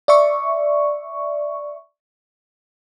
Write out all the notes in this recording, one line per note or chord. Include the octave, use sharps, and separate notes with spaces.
D5 E5 C#6